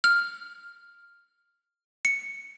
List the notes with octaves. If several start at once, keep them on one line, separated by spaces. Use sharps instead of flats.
F6
C#7